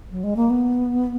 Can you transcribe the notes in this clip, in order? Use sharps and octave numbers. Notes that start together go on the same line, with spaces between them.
F#3
G#3
A#3
B3